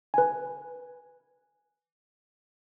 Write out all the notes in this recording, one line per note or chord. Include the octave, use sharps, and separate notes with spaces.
B4 G#5